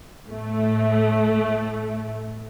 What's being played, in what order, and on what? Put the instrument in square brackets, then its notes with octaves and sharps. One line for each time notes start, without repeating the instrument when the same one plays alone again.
[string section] A2 A3